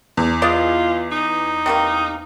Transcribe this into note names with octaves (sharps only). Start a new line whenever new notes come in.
E2
G#3 F4 D5 D#5
D#4
C3 D#3 A#3